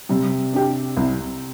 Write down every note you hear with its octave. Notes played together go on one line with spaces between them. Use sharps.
C3 G3
D4 G4
C2